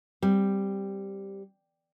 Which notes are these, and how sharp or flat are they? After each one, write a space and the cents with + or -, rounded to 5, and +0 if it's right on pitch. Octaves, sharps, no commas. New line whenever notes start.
G3 +0 C4 +0